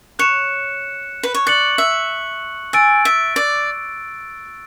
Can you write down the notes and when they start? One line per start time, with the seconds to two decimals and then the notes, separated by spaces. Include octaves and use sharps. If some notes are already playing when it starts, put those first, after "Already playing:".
0.19 C#5 F#6 C#7 E7
1.23 B4
1.34 C#5
1.46 D5 C#6 F#6 C#7 F#7
1.78 E5
2.73 G#5 E6 A6 D7
3.05 E5
3.36 D5